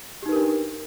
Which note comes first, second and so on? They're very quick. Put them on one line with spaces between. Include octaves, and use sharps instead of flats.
G4 D#4 B4 A#4 D4